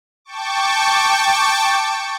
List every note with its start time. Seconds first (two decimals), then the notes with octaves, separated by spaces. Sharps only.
0.25 G5 A5 C#6 D6